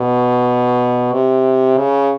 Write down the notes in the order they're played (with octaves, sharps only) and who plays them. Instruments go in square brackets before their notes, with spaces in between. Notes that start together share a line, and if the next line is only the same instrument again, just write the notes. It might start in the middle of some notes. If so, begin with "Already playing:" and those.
Already playing: [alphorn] B2
C3
C#3